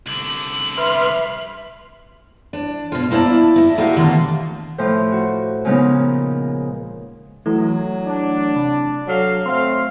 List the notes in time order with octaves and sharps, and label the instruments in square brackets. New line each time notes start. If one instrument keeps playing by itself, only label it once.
[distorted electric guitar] C2 D3 [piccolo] F#7
[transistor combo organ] B4 C6 F6 [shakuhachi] E5
[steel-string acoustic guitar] D4
B2 F4
A#3 E4 C5 D5 A5
D#4 E4
A#2 D#4 F#4 G4 F5
B2 D3 D#3 A3 A#3
[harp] A2 F3 C5
F#4
A#2 C#3 F3 G#3 B3 D#4
[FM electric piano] E3 A3 [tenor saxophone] F#3
[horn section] D4
[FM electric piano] C3
[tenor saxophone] F#3 [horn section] A4 F5
[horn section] A3 F5 [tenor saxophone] C4 [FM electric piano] C6